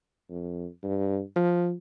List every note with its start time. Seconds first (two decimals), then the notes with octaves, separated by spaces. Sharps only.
0.30 F2
0.83 G2
1.36 F3